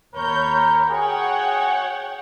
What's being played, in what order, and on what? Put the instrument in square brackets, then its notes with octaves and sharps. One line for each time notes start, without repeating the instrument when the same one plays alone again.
[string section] D#2 C#5 G6 [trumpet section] A#4 A#5 B5
[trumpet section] F#4 G#4 [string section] C#5 F#5 G5